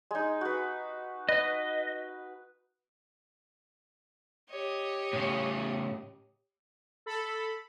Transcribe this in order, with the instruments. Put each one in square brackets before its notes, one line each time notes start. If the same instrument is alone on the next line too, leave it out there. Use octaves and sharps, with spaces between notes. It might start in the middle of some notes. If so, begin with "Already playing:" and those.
[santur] G#3 D#4
F#4 B4
[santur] B4 [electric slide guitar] D#5
[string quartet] G4 C#5 D#5
[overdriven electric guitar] A2 C#3
[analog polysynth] A4 B5